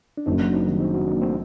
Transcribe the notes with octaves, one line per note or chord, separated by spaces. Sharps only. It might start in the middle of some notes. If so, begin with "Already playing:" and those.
D4
F#1 F#2 F#3 C4 D#4
D4 F#4
C4 D#4
D#3 G3
C4 D#4
D4 F#4
A#3 D4
A3 C4